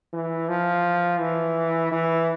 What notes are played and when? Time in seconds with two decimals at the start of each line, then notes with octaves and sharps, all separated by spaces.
0.13 E3
0.49 F3
1.20 E3
1.91 E3